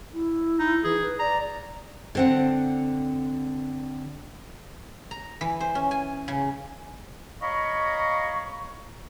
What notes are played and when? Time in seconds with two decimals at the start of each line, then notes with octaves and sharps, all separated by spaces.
0.13 E4
0.59 D#4
0.84 E3 G#4
1.02 B4
1.19 D5 A#5
2.15 D3 C4 F#5
5.11 A#5
5.41 E3
5.60 C5
5.75 C#4
5.91 G#5
6.28 C#3
7.42 C#5 D#5 F5 A#5 B5 C#6